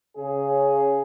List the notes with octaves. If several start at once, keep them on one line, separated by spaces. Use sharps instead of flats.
C#3 G#4